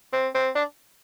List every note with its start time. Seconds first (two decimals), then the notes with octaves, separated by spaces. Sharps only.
0.13 C4
0.35 C4
0.56 D4